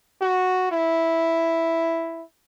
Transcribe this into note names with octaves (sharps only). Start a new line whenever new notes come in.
F#4
E4